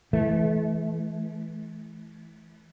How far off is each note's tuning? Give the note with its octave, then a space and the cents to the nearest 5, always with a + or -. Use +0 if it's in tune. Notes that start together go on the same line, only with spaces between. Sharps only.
E3 -5 A3 -40